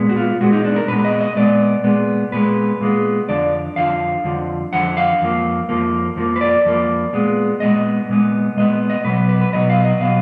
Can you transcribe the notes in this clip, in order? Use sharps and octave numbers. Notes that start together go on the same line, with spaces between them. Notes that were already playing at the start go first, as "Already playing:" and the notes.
Already playing: A#2 G#3 B3
F#4
F4
A#2 G#3 B3 F#4
D#4
D4
A#4
A#2 G#3 B3 B4
D#5
D#5
A#2 G#3 B3 D5
A#2 G#3 B3
A#2 G#3 B3 B4
A#2 G#3 B3
F2 D3 F3 D5
F2 D3 F3 F5
F2 D3 F3
F2 D3 F3 F#5
F5
F2 F3 A#3
F2 F3 A#3
F2 F3 A#3
B4
D5
F2 F3 A#3
A#2 G#3 B3
A#2 G#3 B3 D#5
A#2 G#3 B3
A#2 G#3 B3 D#5
D#5
B2 F#3 B3 B4
B4
B4
B2 F#3 B3 D#5
F5
D#5
B2 F#3 B3 F5